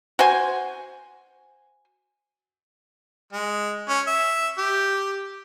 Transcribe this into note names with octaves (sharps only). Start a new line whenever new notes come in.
F#4 C5 G#5
G#3
C#4
E5
G4